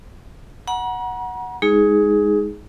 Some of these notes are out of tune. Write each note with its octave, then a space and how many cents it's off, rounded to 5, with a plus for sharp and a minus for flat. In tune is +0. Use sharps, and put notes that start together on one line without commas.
F#5 +0 A#5 +40
G#3 +0 D#4 +20 G#4 +0